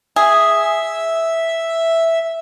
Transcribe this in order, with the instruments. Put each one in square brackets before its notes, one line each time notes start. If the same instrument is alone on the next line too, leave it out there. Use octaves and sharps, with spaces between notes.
[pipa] G#4 [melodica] E5